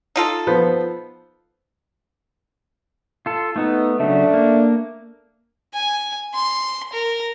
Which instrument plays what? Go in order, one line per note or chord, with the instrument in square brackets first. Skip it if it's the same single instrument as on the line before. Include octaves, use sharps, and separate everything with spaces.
[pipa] D#4 F4 A4
[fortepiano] F3 B3 C5
[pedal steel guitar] F4 A4
[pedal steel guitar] A3 B3 [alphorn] D#4
[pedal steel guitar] C#3 F#3 [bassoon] A3 [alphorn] D4
[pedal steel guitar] A#3
[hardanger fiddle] G#5
C6
A#4